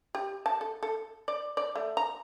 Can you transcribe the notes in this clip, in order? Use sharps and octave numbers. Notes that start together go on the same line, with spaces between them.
G4
A5
A4
A4
D5
D5
A3
A#5